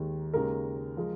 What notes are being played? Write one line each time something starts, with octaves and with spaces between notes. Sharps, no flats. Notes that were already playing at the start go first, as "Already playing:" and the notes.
Already playing: D#2 D#3 G#3
D#2 C#3 G#3 A#4
F3 G#3